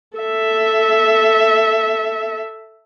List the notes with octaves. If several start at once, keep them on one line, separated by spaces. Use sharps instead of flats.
A4 E5